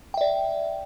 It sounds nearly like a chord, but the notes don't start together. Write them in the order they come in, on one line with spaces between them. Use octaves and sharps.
G5 E5 D5